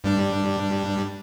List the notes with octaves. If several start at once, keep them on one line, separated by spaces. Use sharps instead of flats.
G2 G3 D4